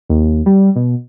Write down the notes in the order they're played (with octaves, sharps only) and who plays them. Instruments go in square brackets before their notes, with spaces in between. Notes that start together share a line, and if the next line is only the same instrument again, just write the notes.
[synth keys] D#2
G3
B2